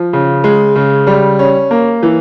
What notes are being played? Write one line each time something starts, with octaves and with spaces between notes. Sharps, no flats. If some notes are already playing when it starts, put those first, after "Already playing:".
Already playing: F3
C#3
G#3
C#3
G3
C#4
A#3
E3